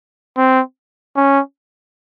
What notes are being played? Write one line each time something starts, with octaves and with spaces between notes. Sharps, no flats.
C4
C#4